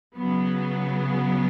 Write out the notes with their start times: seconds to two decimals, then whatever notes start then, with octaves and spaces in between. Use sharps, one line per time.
0.17 C#3 F#3 B3